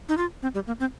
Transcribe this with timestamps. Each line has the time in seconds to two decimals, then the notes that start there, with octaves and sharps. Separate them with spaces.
0.09 D#4
0.17 F4
0.43 C4
0.55 G3
0.67 A#3
0.80 C4